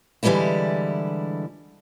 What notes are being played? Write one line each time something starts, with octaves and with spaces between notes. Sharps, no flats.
D3 E3 G3 G#3 A#3 E4